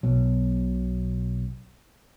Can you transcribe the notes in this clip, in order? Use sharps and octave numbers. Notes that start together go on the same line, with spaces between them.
B1 B2 F#3